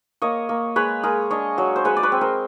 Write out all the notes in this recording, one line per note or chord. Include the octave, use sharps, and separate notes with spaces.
A#3 C#5 D#5
A#3
G#3 B4 C#5
G#3 G#4 A#4
D4 C#5 D#5
F#3
C5
G#3 B4 C#5
D5
B4 C#5
C4
A#4 C5